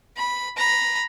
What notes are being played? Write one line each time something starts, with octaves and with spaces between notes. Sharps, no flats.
B5
A#5 B5